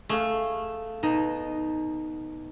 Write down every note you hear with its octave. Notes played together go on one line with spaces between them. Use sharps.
A3 G#4 F5
B2 D#4